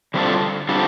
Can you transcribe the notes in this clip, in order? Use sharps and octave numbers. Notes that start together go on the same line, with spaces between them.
D3 G3 C4 F4 A4
D3 G3 C4 F4 A4